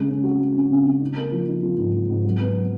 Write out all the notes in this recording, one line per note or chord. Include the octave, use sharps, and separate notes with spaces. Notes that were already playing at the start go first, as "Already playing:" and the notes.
Already playing: C#3 G#3
C#4
F#4
G#3
C#4
C#3
C#3
D#4
A#3
F3
D#4
F3
G#2
F3
G#2
F#3
B3
F#3